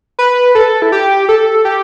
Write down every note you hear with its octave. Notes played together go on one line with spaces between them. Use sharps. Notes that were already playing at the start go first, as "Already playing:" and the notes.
B4
A4
E4
G4
A4
G4